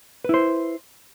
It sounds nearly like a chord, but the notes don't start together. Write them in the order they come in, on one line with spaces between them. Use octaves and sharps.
B4 E4 C5